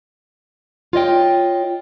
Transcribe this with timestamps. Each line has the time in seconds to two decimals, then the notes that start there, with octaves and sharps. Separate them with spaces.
0.93 F4 C#5 D#5 G5